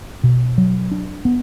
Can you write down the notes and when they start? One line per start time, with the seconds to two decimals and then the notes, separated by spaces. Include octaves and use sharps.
0.23 B2
0.58 F#3
0.91 D4
1.25 B3